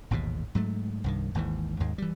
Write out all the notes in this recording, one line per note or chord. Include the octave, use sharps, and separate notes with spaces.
A1 D#2 G#2 B2
G#2 F#3 A3
C2 G2 D#3
G#1 D#2 G#2 E3
D#2 G#2 G#3
E3 G3